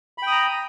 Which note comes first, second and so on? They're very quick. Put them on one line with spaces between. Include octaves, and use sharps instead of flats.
B5 G5 D#6 A#5